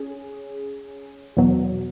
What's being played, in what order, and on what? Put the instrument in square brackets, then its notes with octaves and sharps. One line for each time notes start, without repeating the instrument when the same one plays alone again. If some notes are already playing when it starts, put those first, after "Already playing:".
Already playing: [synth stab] C#4 G#4
E2 B2 F#3